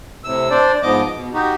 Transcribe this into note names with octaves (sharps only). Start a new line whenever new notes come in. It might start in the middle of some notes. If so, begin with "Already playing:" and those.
A2 C3 E6
D4 C5 D5
G#2 F3 B3 D#5 D6
B2
D#4 F#4 G4